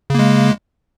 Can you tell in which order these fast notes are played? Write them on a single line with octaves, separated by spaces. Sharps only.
C#3 A#3 G#3